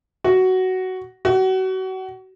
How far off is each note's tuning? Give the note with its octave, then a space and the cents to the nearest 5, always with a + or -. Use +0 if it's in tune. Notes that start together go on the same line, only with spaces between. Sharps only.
F#4 +10
F#4 +30